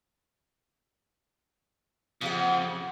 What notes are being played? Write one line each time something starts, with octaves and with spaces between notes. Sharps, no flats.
F2 C#3 G4 F#5